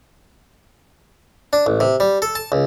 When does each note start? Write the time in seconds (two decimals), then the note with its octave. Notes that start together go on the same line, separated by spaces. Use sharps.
1.53 D4
1.66 A1
1.80 C3
2.00 G3
2.22 A4
2.35 A5
2.52 C#2